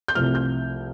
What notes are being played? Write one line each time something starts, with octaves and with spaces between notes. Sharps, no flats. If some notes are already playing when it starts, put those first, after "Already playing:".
G6
C2 C3 F3 A3 F6
G6